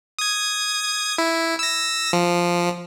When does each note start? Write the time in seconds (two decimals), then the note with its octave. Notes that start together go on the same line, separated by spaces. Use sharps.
0.19 D#6 G#6
1.18 E4
1.59 E6 A#6
2.13 F3